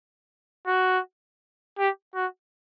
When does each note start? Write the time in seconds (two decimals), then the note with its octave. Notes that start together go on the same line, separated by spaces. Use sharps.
0.67 F#4
1.78 G4
2.15 F#4